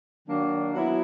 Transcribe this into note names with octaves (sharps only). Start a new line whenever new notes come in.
D#3 F#3 A#3 D4
F#3 B3 E4